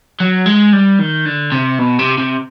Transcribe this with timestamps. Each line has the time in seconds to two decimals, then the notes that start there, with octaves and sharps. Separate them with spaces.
0.20 F#3
0.46 G#3
0.73 G3
0.99 D#3
1.26 D3
1.52 C3
1.79 B2
1.99 C3
2.18 C3